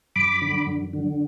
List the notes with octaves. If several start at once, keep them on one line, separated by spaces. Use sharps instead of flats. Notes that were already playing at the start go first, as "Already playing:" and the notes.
F#2 B5 D6
D3
F#2
D3